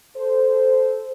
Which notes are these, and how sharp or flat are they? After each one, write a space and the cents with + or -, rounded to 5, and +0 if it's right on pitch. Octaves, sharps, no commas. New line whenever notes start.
A4 -10 C5 -10